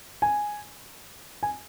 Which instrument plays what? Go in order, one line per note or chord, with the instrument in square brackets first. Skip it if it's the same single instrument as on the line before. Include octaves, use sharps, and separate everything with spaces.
[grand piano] G#5
G#5